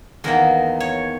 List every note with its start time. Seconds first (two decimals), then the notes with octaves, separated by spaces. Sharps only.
0.24 E2 D#3 A#3 A#4
0.80 C#5